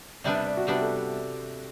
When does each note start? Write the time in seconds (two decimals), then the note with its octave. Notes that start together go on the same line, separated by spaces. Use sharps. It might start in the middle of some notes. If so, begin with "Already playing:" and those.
0.24 C3 G3 B3 D4 D5
0.35 E5
0.46 D5
0.57 F#4
0.67 C3 G3 B3 D4 G4
0.81 A4